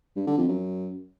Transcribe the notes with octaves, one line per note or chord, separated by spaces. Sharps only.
G2
D3
F2
F#2